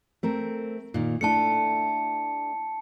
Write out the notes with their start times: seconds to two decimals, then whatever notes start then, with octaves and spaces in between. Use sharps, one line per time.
0.23 A3 C4 A#4
0.94 A#2 D#3
1.21 A3 D4 E4 A5 C#7